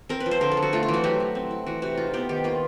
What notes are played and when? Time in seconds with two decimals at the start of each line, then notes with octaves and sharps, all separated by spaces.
0.09 C4 A#4
0.20 B4
0.26 F3
0.31 C5
0.41 D3 A#4
0.52 A4
0.57 D3
0.62 F#4
0.73 A3 F4
0.83 F4
0.88 E3
0.94 F#4
1.04 F#3 G4
1.20 F#3
1.35 C4
1.51 E4
1.66 E3 F#4
1.82 C3 F#4
1.97 D#4 F4
2.13 B3 G4
2.29 D#3 G4
2.44 A#3 F4